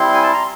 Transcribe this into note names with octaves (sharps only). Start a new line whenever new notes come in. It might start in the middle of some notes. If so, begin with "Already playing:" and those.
Already playing: G3 C4 E4 C6
G#5
A5
A#5